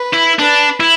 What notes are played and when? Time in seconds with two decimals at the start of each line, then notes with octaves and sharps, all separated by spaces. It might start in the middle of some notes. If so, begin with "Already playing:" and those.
Already playing: B4
0.13 E4
0.39 D4 B4
0.80 E4